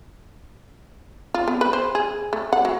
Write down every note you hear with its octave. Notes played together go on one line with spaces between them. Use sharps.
F4
B3
B4
C5
G#4
A3
F#5
F#3